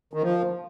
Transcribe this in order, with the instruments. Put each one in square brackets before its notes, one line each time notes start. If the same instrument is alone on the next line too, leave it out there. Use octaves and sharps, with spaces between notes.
[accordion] D#3
F3